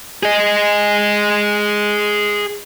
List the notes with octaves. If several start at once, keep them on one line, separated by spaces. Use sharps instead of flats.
G#4 D#5